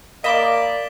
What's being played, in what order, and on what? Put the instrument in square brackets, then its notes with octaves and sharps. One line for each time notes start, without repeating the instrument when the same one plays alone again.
[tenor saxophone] A#3 [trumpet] D5 [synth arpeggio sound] D#5 B5 D6 [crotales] B6 E7 G7